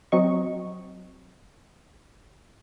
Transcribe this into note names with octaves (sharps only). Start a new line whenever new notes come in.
F#3 C4 D#5 C#6